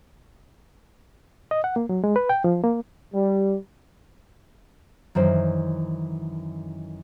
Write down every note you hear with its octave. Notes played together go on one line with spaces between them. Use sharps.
D#5
F#5
A#3
F#3
G#3
B4
G5
F3
A#3
G3
F#2 D#3 E3 C5